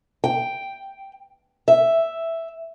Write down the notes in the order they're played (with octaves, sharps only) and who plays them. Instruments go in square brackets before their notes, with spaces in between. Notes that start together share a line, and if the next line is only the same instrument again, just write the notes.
[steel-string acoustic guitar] G5
E5